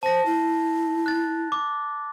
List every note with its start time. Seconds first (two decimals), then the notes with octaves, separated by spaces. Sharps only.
0.03 C5 A5 A#6
0.26 E4
1.06 F#6 A6
1.52 D6